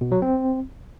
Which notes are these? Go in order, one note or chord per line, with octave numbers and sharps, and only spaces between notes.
B2
F#3
C4